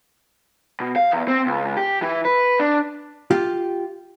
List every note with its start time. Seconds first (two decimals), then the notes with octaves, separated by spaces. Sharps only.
0.80 B2
0.96 F5
1.11 E2
1.28 C4
1.46 C#2
1.77 G4
2.02 E3
2.25 B4
2.60 D4
3.31 F4 G4